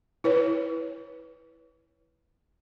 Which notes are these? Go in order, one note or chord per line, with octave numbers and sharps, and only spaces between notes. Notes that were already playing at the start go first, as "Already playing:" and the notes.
E4 B4 C#5